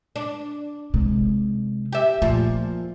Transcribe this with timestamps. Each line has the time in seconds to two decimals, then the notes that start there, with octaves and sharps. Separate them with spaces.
0.16 D4
0.94 C3 G#3
1.92 G4 E5
2.22 A#2 F3 A3